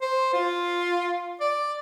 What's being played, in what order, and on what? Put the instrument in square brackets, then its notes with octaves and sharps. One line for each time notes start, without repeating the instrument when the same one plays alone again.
[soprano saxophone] C5
F4
D5